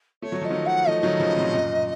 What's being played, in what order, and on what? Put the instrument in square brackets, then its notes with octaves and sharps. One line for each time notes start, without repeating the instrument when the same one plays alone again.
[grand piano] A3 [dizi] C#5
[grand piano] F#3
[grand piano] F3 [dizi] D#5
[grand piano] D#3 F#3
[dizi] F#5
[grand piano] F3 A3 [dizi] D#5
[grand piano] D#3 F#3
C#3 F3
A2 C3
F#2 A#2